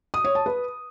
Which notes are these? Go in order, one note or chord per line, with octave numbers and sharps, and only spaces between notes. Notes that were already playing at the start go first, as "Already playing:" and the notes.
D#6
C#5
A5
B4